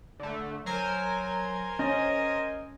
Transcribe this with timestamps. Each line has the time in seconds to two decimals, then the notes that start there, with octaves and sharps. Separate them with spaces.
0.20 D3 A3
0.66 F#3 A#4 C5 G#5
1.79 C#4 D#5